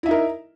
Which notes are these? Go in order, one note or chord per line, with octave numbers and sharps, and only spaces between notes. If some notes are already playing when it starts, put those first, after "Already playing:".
D#4 E4 A#4 E5